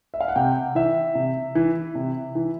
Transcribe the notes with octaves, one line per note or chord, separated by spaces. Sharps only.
E5
F5
F#5
C3 G5
E3 E5
C3
E3
C3
E3